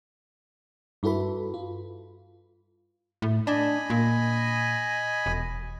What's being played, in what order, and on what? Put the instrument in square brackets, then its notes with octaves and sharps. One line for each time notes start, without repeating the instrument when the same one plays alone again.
[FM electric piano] G2 E4 F#4 A4 B4 B5
F4
[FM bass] A2
[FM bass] D4 [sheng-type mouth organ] D#5 G#5 B5
[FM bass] A#2
E1